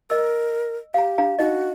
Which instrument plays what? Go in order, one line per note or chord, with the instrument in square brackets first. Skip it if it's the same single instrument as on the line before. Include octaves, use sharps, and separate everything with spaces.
[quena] A#4 [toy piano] D#5 E6
[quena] G4 [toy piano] F5 A#5
[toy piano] D4 F5 A#5
[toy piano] D#4 D#5 [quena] F#4